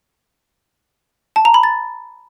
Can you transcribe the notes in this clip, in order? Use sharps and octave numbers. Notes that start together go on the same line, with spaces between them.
A5
A#5
B5
A6